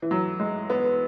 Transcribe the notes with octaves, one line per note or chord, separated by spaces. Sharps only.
E3
F#3
G#3
B3